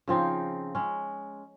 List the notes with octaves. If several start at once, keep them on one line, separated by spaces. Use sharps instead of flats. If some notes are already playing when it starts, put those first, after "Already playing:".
C#3 F3 C4 D#4
G#3 C#4